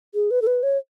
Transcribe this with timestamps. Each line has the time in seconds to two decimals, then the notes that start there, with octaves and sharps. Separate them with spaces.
0.15 G#4
0.31 B4
0.42 A4
0.47 B4
0.63 C#5